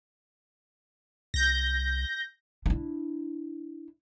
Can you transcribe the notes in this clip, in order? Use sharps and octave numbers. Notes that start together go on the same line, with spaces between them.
C2 G6 A#6
D4 E4